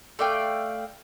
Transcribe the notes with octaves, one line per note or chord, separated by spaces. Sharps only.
A3 D5 F5 G5